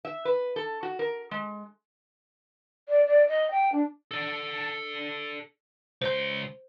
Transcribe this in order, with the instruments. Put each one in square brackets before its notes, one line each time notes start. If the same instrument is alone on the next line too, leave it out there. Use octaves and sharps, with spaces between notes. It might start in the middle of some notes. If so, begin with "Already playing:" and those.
[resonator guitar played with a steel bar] E5
B4
A4
F#4
A#4
G#3
[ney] D5
D5
D#5
G5
D4
[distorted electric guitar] A4 D5
[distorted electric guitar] C#2 C6 [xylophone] C5 G6